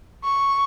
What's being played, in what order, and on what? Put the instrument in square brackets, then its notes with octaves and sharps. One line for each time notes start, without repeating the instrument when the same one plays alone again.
[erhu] C#6